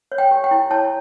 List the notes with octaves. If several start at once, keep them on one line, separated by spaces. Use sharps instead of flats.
C#5
G5
G4
G5
E4
C#5 A5